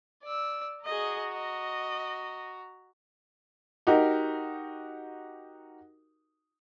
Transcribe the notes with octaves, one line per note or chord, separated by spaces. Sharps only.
D5 E6
F#4 G#4 D#5 A#5
D#5
D#4 F#4 G4 A#4